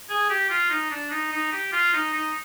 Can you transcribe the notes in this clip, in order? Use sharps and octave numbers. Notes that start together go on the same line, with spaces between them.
G#4
G4
F4
D#4
D4
D#4
D#4
G4
F4
D#4
D#4